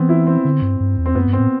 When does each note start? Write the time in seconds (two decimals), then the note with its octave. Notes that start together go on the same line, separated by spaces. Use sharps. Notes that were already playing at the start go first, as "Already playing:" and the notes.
Already playing: E3 B3 C4
0.09 E4
0.27 C4
0.45 D3
0.62 G2
0.80 G2
0.98 E2
1.06 C4
1.15 F#2 B3
1.27 G2
1.33 C4
1.40 A2